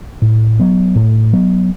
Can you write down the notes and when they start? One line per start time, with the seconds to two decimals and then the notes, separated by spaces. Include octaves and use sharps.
0.22 A2
0.59 F#3 B3
0.95 A2
1.33 F#3 B3